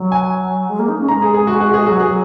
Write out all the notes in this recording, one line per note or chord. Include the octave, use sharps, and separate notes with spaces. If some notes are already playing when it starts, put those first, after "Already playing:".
Already playing: F#3
G#5
G#3
A#3
D#4
C#4
G#3 A#5
G#4
G#4
F#4
G#4
F#4
G#4
F#3 F#4
G#4
F#3